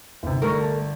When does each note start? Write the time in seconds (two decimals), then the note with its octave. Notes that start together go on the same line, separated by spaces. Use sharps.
0.23 G1 C3 D#3
0.42 G1 A3 D4 A#4 A#5 C#6
0.60 A5